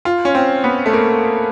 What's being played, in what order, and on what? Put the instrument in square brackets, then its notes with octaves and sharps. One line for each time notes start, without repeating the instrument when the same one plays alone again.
[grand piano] F4
C#4
C4
B3
A3
A#3